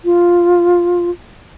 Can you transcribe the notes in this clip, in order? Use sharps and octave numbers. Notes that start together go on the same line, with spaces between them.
F4